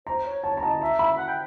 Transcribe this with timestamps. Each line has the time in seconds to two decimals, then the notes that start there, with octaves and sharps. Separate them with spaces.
0.07 C5 A#5
0.26 C#5
0.44 C#5 A5
0.57 A#5
0.63 D#5 A5
0.82 E5 A#5
0.99 E5 B5
1.18 F#5
1.28 G5